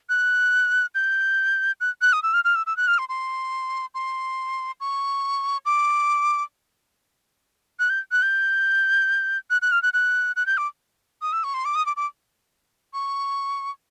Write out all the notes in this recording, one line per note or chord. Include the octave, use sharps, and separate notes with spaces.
F#6
G6
F#6
F#6
D#6
E6
F6
F6
E6
E6
F#6
F6
C6
C6
C6
C#6
D6
F#6
G6
F#6
G6
F#6
F#6
F6
F#6
F#6
F#6
G6
D6
D#6
E6
C#6
C6
D6
D#6
D6
D6
C#6